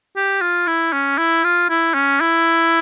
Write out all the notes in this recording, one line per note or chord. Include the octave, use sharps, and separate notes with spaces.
G4
F4
E4
C#4
E4
F4
E4
C#4
E4